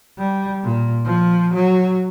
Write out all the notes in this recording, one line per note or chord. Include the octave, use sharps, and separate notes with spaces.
G3
A#2
F3
F#3